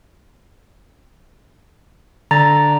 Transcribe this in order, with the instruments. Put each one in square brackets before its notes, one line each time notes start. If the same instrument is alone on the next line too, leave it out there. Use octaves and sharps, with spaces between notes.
[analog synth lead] D3 [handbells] A#5 A6